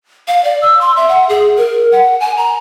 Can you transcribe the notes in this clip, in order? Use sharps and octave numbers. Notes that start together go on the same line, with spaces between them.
F5
D5
E6
C6
E5
F#5
G#4
A#4
F#5
G#5
A#5